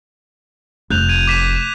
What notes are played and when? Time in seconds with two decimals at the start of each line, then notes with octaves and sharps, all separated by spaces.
0.90 F1 F#6 G6 F7
1.09 G#6 D#7 F7
1.27 D6 B6 E7